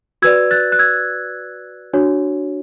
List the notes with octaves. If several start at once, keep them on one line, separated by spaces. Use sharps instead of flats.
F#4 B4 D5 E6 G#6
F#6 A6
F#6
E6 G#6
D4 F#4 C#5